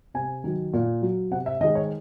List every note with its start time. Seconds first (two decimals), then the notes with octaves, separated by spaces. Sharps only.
0.14 C3 G#5
0.44 D#3 F#3
0.73 A#2
1.02 F#3
1.31 C3 F#5
1.46 E5
1.61 D#3 D#5
1.64 G#3
1.75 C#5